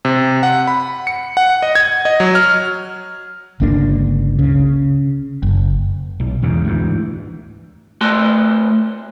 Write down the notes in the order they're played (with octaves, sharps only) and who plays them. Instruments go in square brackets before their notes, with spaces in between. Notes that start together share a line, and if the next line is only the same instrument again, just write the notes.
[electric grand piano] C3
F#5
B5
C#7
F#5
D#5
G#6
D#5
F#3
F6
[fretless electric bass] G1 C#2 A#3 D4
C#3
F#1
[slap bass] B1
E2 G#2 C#3
D2 G#2 E3
[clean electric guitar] A2 A3 F#4 A5 C6